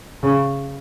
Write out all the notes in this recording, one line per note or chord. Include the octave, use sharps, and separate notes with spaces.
C#3